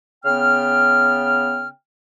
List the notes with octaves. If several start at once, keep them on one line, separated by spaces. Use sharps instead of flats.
C#3 B3 G5 F6